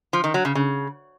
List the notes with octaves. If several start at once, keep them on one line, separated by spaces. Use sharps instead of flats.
F3
D#3
F#3
C#3
C#3